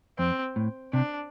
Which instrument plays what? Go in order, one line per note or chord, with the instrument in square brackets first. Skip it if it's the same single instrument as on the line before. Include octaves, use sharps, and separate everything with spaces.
[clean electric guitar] F2 [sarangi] C4
[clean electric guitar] A2
[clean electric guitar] C3 [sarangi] D4